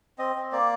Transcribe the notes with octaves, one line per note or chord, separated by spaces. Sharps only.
C4 D#5
C4
A#3 D5